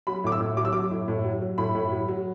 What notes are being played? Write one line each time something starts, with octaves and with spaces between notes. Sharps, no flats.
F#3 B5
A2 D6
E6
A2
F#3 D6
E6
F#3 D6
A2
A2
F#3
F#3
A2 B5
A2
F#3
F#3